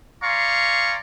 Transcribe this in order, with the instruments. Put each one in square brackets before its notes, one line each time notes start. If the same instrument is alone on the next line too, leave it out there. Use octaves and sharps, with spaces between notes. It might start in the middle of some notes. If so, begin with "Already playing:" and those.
[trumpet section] D5 F5 G#5 A#5 C6 C#6